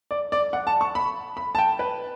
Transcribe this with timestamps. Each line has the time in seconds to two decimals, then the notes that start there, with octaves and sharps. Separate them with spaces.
0.11 D5
0.32 D5
0.53 F#5
0.67 A5
0.81 C#6
0.95 B5
1.37 B5
1.55 A5
1.58 G5
1.79 B4